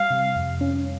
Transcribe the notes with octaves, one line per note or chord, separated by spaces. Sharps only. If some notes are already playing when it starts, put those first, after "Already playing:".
Already playing: G3 F5
C3
F2
C#4